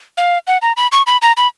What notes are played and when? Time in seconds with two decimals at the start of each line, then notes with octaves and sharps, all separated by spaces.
0.17 F5
0.47 F#5
0.62 A#5
0.77 B5
0.92 C#6
1.07 B5
1.22 A#5
1.37 B5